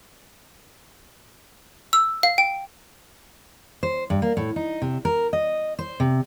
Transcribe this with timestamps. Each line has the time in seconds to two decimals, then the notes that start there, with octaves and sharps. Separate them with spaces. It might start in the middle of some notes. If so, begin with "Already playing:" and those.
1.93 E6
2.23 F5
2.38 G5
3.83 C5
4.10 G2
4.22 A#3
4.37 A2
4.56 D#4
4.82 C3
5.05 A#4
5.33 D#5
5.79 C5
6.00 C3